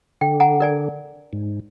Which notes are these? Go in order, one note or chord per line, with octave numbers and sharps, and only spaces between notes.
D3 G5
F#5 G#5 A#5
A#4 D5 G#5
G#2